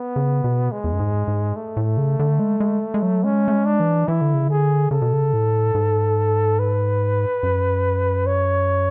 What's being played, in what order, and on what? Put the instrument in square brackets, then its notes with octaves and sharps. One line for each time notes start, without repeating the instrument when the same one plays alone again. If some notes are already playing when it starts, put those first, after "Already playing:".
Already playing: [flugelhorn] B3
[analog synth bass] C#3
B2
[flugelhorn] G#3
[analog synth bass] E2
F#2
G#2
G#2
[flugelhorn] A3
[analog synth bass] A2
C#3
D3
G#3
G#3
G#3
F#3
[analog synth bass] G#3 [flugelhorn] C#4
[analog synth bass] A3
G#3
[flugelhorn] D4
[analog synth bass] E3
[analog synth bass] E3 [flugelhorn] E4
[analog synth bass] D3
C#3
[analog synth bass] D3 [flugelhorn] G#4
[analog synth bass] C#3 [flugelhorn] A4
[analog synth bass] B2
C#3
A2
G#2
[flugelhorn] B4
[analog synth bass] F#2
[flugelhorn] C#5